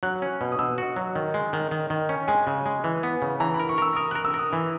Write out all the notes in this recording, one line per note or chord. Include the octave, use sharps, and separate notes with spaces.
F#3 F#6
C#4
B2
D#6
B2 E6
F#4
F#3
D#3
G#3
D#3
D#3
D#3
C#4
G#3 G#5
C#3
G#3
E3
B3
C#3
E3 A#5
B5
A#4
C#6
A#4 E6
A#4 D#6
A#4 F#6
E6
A#4
D#6
E3